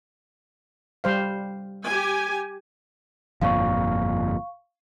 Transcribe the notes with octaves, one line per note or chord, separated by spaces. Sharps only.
G3 C5 F5
G4 G#5
G1 F2 A#2 F5 C#6